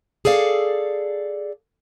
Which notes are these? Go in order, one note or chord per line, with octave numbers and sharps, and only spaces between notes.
G#4 A4 D5 F5